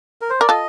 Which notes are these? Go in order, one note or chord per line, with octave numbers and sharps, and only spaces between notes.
A#4
C5
A#4 D5
F4 A4 D#5